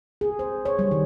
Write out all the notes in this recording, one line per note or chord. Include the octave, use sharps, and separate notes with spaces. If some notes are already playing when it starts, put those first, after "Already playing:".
G#4
C5
C#5
G3
D#3